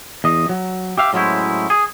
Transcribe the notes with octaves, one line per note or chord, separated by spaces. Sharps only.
E2 D#5
F#3
G4 E5 F5
A2 F#3 G#3 C#4 E4 C5
G#4